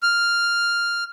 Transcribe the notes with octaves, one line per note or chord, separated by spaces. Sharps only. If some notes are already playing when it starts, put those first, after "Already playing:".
F6